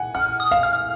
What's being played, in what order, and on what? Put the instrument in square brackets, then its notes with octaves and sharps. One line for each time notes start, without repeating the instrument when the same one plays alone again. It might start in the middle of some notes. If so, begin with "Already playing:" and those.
Already playing: [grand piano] F#5 G#5
[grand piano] F#5 [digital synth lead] F6
[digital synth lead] D#6
[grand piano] F5
[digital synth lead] F6